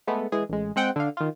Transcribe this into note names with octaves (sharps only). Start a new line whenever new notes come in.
G#3 A3 B3
E3 G#3 G#4
A1 G#3
G#3 C4 F#5 G5
D3 F5
D#3 F4